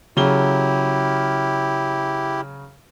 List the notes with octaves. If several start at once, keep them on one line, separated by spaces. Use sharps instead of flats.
C#3 F#3 E4 G4 G7